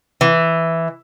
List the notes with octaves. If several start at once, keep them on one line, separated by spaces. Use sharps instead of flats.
E3